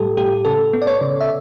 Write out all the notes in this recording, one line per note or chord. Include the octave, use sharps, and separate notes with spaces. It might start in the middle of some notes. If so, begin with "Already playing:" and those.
Already playing: A2 G3 G4 A4
A2 G4
C#3 A4
B3
D5
C#5
C#3
E5